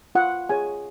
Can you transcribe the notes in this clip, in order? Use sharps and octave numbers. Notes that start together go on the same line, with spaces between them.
F4 F#5
G#4 C#5 G#5